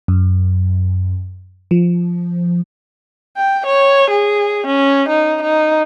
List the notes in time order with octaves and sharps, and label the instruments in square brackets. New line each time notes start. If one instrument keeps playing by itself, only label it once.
[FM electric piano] F#2
F3
[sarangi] G5
C#5
G#4
C#4
D#4
D#4